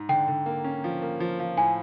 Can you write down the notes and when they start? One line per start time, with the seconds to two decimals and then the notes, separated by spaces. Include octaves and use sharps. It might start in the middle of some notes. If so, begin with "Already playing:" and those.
Already playing: G#2
0.09 D3 G5
0.28 D3
0.46 A#3
0.64 C#4
0.84 F3
1.02 A#3
1.20 F3
1.40 F3
1.57 A2 G#5